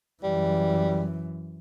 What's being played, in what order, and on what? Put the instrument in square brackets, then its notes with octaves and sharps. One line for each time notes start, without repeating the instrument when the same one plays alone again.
[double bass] F#2 E3 [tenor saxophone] G3